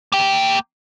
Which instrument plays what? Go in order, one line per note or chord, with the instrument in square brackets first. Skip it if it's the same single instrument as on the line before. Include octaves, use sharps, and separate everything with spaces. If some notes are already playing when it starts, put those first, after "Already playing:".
[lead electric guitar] A#3 G5